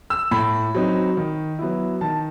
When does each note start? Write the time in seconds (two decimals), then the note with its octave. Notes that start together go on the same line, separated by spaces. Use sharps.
0.10 E6
0.31 A2 B5
0.75 F#3 C4 D#4
1.17 D#3
1.59 F#3 B3 E4
2.01 D#3 A5